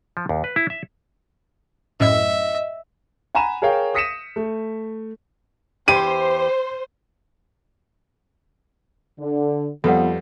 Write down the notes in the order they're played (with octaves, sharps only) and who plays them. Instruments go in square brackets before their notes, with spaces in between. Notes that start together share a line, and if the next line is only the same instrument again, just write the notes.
[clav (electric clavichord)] F3
D#2
B4
E4
E5
[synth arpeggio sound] F#2 A2 E6 [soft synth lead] D#5 [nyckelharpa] E5
[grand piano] F#5 G#5 A#5 B5 D#7 E7
G#4 A#4 C#5 F5 G5
D#6 A#6 B6 C#7 D#7 E7
A3
[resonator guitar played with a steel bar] E2 G4 [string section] C5 [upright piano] D#7
[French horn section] D3
[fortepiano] F2 G3 [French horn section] F3 B3 [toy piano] A4 B4 F#5